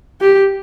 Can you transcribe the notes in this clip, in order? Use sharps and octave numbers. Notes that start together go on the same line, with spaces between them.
G4